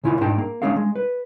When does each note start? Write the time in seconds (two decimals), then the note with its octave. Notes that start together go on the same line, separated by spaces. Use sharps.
0.04 C#2 A#2 E4 F4 G#5
0.21 G#2 D4 G#4 G5 A5
0.38 A#3
0.62 G#3 C#4 D4 G#4 F5
0.76 G#3
0.96 B4